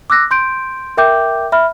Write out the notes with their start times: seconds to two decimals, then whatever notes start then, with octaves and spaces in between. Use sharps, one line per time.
0.10 D6 E6 F#6 A#6
0.31 C6 G6 D7
0.97 A#4 E5 G5 D6 G6
1.52 E5 B5 F6